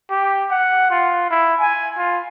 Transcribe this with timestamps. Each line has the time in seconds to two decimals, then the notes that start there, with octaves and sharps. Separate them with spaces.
0.11 G4
0.50 F#5
0.91 F4
1.30 E4
1.60 G#5
1.97 F4